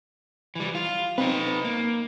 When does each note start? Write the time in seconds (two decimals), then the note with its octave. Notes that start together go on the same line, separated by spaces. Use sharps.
0.55 E3 G3
0.75 F4
1.18 C4 D#4 B4
1.64 A#3